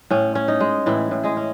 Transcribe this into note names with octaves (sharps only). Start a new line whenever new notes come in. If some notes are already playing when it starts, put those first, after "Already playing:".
A2 C#4
C#4
D#4
G#3
A2 E3 E4
A2
G#3 G#4
C#4